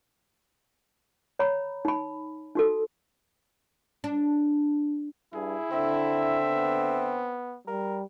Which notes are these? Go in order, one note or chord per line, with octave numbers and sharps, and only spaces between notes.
C#5 A#5 B5
D#4 B5
D#4 F#4 A4
D4
G2 E4 G#4
D3 C4 E5
B3
G3 A#4